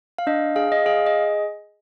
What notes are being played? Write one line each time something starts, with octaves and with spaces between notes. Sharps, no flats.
F5
D4 D#5
G#4 F5
D#5
G#4 F5
D#5